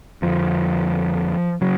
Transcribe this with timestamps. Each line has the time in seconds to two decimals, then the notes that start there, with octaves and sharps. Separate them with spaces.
0.22 F2 D3 F3
1.61 C#3 F#3